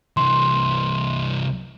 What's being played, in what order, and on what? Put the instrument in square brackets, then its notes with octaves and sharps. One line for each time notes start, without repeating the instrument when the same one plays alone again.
[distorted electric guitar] C2 E3 [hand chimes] C6